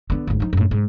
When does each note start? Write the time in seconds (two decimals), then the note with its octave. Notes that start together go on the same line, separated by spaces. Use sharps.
0.10 D3 B3
0.27 G#1 D2
0.40 F3 D#4
0.53 F#2 A2
0.71 G#2